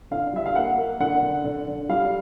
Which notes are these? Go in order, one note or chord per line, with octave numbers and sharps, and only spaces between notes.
D3 F5
G3 E5
F5
A#3 F#5
A#3
D3 F#5
D3
D3
D3
G3 F5